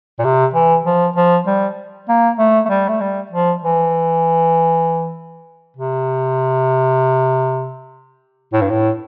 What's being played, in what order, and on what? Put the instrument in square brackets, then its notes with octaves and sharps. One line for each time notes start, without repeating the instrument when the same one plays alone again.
[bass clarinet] A#2
C3
E3
F3
F3
G3
A#3
A3
A3
G3
A3
G3
F3
E3
C3
A2
G2
A2